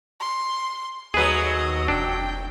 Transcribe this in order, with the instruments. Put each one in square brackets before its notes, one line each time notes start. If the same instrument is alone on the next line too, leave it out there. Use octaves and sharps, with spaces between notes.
[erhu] C6
[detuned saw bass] D#2 [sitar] F#3 A3 [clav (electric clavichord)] G#4 B4 [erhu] D#5
[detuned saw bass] F1 [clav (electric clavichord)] D4 [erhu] G5